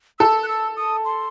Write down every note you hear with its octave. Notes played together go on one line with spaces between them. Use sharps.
A4 E6
F#6
E6
D#6
C6